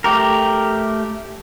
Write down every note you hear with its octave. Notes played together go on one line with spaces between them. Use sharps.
A3 G4 A#4